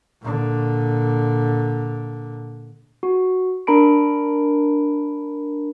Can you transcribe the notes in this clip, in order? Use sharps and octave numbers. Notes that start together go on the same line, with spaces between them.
A#2 D3
F#4
D4 A#4 A#5 B5 D7